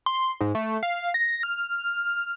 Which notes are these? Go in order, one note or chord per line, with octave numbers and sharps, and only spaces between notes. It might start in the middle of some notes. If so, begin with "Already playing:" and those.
C6
G#2
A3
F5
A#6
F6